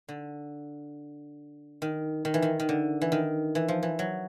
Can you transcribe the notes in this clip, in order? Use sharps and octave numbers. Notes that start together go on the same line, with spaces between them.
D3
D#3
D#3
E3
D#3
D#3
D3
E3
D#3
E3
F3
E3
F#3